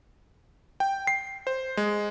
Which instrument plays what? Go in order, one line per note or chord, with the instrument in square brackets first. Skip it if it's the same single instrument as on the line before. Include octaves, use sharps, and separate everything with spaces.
[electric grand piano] G5
C7
C5
G#3